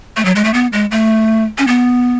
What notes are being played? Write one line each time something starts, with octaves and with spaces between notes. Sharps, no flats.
A3
F#3
G#3
A3
B3
G#3
A3
C#4
B3